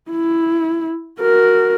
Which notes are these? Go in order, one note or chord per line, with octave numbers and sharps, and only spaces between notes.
E4
F#4 A#4